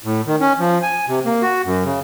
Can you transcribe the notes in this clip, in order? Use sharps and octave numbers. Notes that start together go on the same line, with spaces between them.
A2
D#3
C#4
F3
G#5
C3
A#3
F#4
F#2
C#3